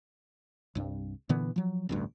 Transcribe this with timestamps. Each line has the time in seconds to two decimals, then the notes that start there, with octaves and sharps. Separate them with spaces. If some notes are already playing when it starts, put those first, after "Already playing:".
0.75 C2 G2
1.29 A#2 D3 E3 B3
1.56 F3 F#3
1.89 A1 D2 G2